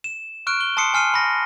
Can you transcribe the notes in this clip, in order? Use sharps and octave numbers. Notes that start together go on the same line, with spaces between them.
E7
C#6 F6 F#6 D7
G7
A5 C6 D#6 C7 C#7
G#5 F6 C7 D#7
B5 A#6